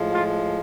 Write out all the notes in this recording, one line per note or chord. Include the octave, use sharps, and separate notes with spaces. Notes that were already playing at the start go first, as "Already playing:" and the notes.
Already playing: A2 F3 G#3
F4